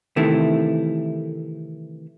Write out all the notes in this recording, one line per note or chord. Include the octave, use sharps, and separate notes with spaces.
C3 D#3 E3 A3 E4